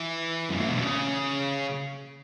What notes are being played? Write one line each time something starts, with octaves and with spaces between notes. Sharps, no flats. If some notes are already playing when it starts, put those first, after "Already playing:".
Already playing: E3
F#2
A2
B2
C#3